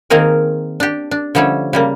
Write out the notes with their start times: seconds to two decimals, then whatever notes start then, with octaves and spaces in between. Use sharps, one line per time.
0.10 D#3 A#3 C4 G#4 A#4
0.80 D4 G4
1.11 D4
1.35 D3 F3 G3 A3 C#4
1.73 C#3 G3 A#3